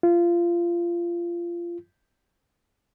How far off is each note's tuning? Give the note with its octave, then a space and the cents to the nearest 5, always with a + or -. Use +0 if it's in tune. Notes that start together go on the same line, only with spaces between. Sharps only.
F4 -20